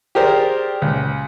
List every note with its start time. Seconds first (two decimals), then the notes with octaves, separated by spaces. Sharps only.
0.15 G4 G#4 A#4 C5 D5
0.82 C#2